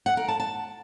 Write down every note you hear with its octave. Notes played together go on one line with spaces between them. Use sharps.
F#5
A#4
A5
A5